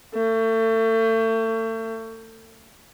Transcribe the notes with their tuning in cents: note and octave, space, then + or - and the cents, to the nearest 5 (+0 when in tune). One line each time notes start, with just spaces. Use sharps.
A3 +35